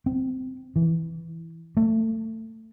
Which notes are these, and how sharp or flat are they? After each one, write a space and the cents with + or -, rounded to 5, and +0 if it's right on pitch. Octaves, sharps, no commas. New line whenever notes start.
C4 -15
E3 +0
A3 +25